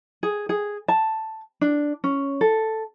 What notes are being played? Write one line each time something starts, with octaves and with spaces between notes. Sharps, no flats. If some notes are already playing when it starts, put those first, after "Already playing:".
G#4
G#4
A5
D4
C#4
A4